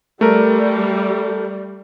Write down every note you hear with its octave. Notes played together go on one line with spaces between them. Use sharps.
G3 A3 A#4